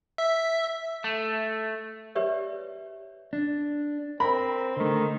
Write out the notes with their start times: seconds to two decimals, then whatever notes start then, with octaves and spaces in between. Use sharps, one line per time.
0.18 E5
1.04 A3
2.15 G4 B4 C#5 D5 E5
3.33 D4
4.20 C4 A#4 B5
4.77 D3 D#3 A3